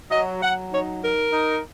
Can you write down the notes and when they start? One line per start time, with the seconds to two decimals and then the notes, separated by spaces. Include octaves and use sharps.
0.11 F#3 D#5
0.42 F#3 F#5
0.72 D#4 C#5
1.03 D#4 A#4
1.33 D#4